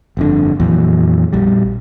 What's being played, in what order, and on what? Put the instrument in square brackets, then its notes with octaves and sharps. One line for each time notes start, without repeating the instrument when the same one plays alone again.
[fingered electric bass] G1 F2 D3
F2 A#2 E3 F#3
A#1 G3